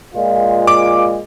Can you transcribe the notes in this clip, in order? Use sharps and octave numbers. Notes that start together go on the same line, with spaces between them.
A#2 G#3 F4
D6